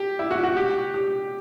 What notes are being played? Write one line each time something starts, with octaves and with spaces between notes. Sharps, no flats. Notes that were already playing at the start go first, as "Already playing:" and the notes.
Already playing: G4
E4
F#4
F#4
G4
G4